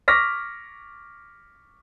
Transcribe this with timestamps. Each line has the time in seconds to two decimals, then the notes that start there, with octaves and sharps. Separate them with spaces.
0.08 C#6 D6 F6 A#6 B6